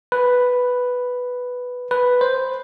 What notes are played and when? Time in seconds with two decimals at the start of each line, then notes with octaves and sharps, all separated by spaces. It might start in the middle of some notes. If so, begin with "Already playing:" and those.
0.12 B4
1.91 B4
2.21 C5